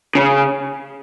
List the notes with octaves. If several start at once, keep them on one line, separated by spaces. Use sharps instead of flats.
C#3